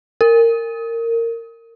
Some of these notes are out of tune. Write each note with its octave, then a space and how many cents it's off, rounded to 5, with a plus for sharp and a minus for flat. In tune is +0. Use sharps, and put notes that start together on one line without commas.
A#4 -20